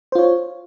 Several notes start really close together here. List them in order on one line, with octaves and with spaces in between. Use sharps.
C5 F4 C#5